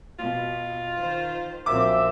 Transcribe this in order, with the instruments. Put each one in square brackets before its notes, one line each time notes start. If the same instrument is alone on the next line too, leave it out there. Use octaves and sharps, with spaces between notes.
[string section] B2 [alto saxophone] F4
[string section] D#3 C5
[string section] A#1 C4 [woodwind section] F#2 F3 E5 [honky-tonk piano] D6